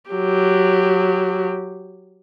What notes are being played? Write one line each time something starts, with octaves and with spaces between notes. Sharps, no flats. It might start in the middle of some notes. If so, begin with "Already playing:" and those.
F#3 G4